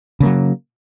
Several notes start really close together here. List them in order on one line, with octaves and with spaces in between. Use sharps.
C#3 A#3 F#3